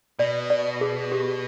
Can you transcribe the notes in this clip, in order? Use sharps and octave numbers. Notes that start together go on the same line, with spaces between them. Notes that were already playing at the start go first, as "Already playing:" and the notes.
B2 D5
D5
G#4
G4